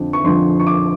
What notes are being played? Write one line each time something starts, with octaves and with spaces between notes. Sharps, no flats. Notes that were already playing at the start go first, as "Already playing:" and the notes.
Already playing: F2 D3 F3
C#6
F2 D3 F3 C6
C#6
D6